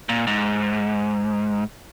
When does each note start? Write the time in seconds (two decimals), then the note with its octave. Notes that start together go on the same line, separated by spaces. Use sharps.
0.09 A#2
0.27 G#2